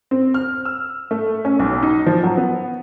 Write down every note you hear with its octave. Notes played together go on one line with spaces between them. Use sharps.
C4
F6
E6
A3
C#4
B1
D#4
F3
F#3
B3